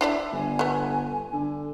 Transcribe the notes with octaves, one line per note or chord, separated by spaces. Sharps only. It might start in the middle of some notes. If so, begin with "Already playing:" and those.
D4 E4 D5 E5
G1 G#5
A3 B3
D3